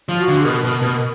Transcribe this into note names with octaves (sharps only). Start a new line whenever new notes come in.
F3
F#4
D3
B2 A#4
B2
B2